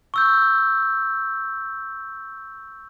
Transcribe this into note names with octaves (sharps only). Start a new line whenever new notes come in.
C#6 E6 G6